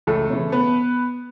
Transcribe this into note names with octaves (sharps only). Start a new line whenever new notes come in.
C#2 A3 A4
C#3 E3
B3 B4